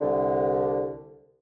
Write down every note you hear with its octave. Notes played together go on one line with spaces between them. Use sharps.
C2 D3